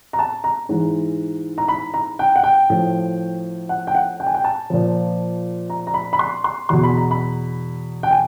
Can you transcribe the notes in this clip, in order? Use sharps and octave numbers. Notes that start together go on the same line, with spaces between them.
A#5
A5
A#5
G#2 E3
A#5
B5
A#5
G5
F#5
G5
A2 F3
F#5
G5
F#5
G5
G#5
G5
A5
A#2 F3
A#5
A#5
B5
B5
C6
C6
E2 B2 C6
B5
A#5
B5
G5
G#5